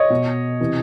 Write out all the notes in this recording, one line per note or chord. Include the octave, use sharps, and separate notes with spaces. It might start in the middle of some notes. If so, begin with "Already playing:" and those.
Already playing: C#5 D#5
B2
C3 E3